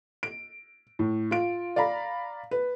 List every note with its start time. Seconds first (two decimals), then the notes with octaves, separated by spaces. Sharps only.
0.23 D7
0.99 A2
1.31 F4 D7
1.76 D5 F5 A#5 B5
2.51 B4